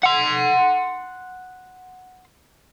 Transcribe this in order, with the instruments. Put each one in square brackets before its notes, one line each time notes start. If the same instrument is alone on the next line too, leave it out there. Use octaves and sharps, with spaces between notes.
[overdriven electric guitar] F#5 C6